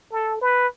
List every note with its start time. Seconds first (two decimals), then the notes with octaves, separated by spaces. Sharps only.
0.12 A4
0.41 B4